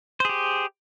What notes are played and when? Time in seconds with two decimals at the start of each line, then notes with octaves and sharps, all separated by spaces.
0.20 C5
0.25 G#4
0.29 G4